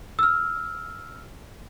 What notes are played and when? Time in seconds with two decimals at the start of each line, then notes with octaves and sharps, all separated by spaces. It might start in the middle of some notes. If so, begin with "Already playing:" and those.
0.19 E6 F6